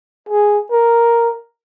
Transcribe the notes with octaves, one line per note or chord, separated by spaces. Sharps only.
G#4
A#4